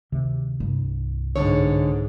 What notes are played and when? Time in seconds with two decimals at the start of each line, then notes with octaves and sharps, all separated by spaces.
0.12 D2 C3 D#3
0.60 C2 G2
1.36 G#2 D3 C#5